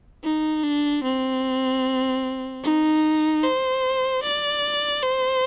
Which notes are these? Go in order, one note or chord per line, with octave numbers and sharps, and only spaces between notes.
D#4
D4
C4
D#4
C5
D5
C5